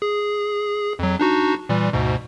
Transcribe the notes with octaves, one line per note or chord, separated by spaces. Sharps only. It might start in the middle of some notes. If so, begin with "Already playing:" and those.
G#4
F2 F#3
D4 D#4 F#4
A#2 E3 G3
D2 G#2 B2